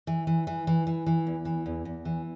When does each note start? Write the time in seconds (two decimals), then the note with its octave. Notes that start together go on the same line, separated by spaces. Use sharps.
0.07 E3
0.27 E3
0.47 E3
0.67 E3
0.87 E3
1.06 E3
1.27 E2
1.45 E3
1.66 E2
1.85 E2
2.05 E3